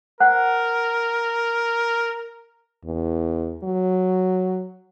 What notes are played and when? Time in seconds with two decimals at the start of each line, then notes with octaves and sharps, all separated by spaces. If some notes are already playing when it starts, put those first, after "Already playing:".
0.20 A#4 C5 F#5
2.85 E2
3.64 F#3